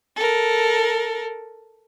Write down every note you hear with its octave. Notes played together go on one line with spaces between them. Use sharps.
A4 A#4